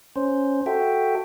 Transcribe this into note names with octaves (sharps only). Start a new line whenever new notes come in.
C#4 C5
F#4 A4 E5 G5